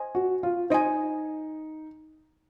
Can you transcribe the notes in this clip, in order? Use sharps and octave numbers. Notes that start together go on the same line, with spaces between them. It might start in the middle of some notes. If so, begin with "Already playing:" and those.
Already playing: C5 D#5 G#5
F#4
F4
D#4 C5 D#5 G#5